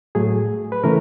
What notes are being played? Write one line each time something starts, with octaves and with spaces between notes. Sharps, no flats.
A2 F#3 A3 G#4
B4
C#3 E3 A3 A#4